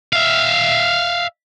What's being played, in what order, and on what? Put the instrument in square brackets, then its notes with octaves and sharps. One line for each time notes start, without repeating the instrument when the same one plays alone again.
[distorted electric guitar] E5 F5